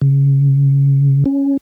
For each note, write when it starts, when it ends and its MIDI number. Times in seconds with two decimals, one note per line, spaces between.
0.01 1.24 49
1.26 1.57 61